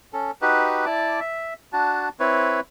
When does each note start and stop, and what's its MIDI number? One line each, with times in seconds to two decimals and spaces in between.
0.13 0.31 61
0.13 0.31 69
0.42 0.85 63
0.42 0.85 66
0.42 0.85 67
0.42 0.85 71
0.86 1.20 64
0.86 1.20 74
0.86 1.20 81
0.86 1.20 86
1.20 1.54 76
1.73 2.09 62
1.73 2.09 66
1.73 2.09 81
2.20 2.60 60
2.20 2.60 64
2.20 2.60 71
2.20 2.60 73